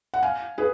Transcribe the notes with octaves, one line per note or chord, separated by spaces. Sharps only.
F#5
F5 G#5
G#4 B4